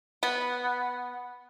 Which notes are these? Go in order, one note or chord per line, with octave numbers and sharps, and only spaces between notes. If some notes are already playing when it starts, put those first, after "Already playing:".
B3